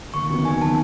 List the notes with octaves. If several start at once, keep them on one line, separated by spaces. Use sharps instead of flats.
D#2 C#6
D#3 F#3 B3
D#2 G#5
D#3 F#3 B3 A5